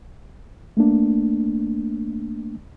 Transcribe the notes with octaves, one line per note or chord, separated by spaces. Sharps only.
A3 A#3 D4